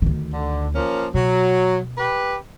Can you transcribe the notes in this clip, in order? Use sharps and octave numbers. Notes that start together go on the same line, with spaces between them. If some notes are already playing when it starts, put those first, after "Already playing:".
D2 D#3
D3
F3 A#3 C#4
B2 F#3
G4 B4